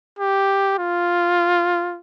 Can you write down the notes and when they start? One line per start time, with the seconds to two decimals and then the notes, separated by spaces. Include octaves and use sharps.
0.19 G4
0.78 F4